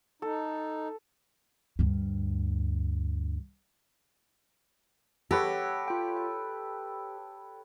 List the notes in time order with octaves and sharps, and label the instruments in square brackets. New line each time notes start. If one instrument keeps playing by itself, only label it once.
[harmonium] D#4 [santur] A4
[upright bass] D2 G2
[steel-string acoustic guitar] G4 [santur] A4 B4 C#5 [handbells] F#5 A#6
[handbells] F4 G5
G5